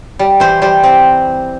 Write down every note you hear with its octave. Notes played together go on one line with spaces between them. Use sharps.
G3
E3 C5
G3 C5
C4